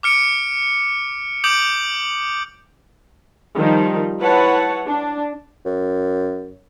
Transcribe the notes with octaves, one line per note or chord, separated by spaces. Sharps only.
D6 F6 C#7 D7
D6 D#6 G6 D7 F#7
D#3 F3 G3 D#4
E4 B4 C#5 F#5 A5
D4
F#2